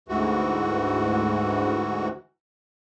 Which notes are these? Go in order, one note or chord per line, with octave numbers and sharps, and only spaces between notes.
D2 G#2 E3 F#4